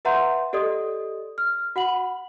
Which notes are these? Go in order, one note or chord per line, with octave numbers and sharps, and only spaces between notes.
B4 E5 F#5 A#5 C6 G6
G4 A4 D5 D#5 D#6
F6
F#4 F#5 B5 F#7